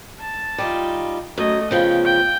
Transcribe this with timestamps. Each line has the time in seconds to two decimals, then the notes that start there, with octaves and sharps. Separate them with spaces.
0.20 A5
0.58 G3 D#4 F4
1.38 F#2 A3 D#5
1.71 C#3 F3 B3 G5
2.04 G5